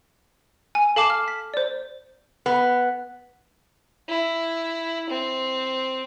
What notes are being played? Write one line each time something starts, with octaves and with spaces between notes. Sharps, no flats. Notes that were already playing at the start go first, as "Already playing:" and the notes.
G#5
A4 F5 A5 D6 C7 E7
F6
B6
C5 D5
B3
E4
C4